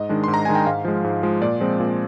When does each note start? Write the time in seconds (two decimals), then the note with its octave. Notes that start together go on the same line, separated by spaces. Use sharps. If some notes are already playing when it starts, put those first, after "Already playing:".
Already playing: G#2 D#5
0.09 D#3 G#3 D4
0.24 G#2 C6
0.34 A#5
0.45 D#3 G#3 D4 G#5
0.55 G5
0.66 G#2 F5
0.85 F3 G#3
1.04 G#2
1.23 F3 G#3
1.42 A#2 D5
1.60 F3 G#3 C4
1.80 A#2